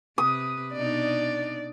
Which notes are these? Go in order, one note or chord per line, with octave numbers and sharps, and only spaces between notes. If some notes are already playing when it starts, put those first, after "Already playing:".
C3 B4 D#6
B2 D4 D#4 D5